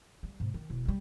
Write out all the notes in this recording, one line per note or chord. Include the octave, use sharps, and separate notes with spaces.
G3
G#2 C3
D#3
E1
F#3 G3